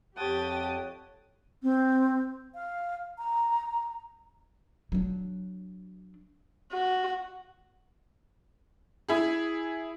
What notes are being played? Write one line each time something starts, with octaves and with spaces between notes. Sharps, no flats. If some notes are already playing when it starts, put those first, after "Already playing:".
F2 G4 C#5 F#5 G5 A5 D#6 A6
C4
F5
A#5
F#3 D4
F#4
E4 G#4